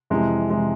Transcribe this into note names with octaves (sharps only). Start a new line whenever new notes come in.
F2 C3 E3 G#3
C3 E3 G#3